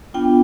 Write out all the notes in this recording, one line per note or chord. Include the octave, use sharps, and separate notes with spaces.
B3 D4 F4 G5